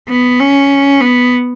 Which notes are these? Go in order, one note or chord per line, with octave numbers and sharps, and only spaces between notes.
B3
C#4
B3